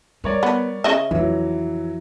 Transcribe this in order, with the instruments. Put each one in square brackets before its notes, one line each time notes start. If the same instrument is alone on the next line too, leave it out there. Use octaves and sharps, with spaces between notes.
[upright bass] G3 [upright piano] A#4 C#5 D5
[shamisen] B3
C#3 D#5 E5
[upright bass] F2 [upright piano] E3 F#3